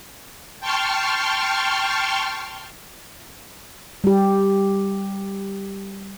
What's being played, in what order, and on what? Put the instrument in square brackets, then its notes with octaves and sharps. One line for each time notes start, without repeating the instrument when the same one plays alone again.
[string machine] G5 A5 C6 C#6 F6
[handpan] G3 G4